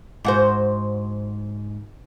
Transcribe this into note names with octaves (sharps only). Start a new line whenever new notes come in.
G#2 F#4 C5